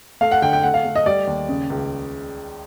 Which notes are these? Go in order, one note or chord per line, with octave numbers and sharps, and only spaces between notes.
A3 F5
F#5
D3 G5
G5
A3 F#5
F5
A3
D#5
G3 D5
D#2
C#3
C#2